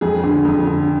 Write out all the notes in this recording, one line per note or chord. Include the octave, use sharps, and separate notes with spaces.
F2 G#4
D3
F2
D3